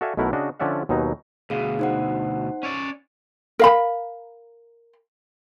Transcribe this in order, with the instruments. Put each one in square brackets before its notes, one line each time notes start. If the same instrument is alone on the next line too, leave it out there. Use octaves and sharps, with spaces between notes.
[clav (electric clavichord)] F#4 A4 D5 E5 F5 G#5
B1 B2 A3 E4 A#4 F#5
C#3 D4 F#4 D#5
D3 F3 C#4 D5 E5 F#5
D#2 B2 F#3 D#4
[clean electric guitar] D2 B2 [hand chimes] G#4 F5
[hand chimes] D#4 C5 F#5
[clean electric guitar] C#4 C#5 D5
[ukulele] A#4 F5 B5